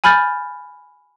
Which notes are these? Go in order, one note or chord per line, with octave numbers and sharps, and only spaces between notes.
G#5 B5 F6 G6 A6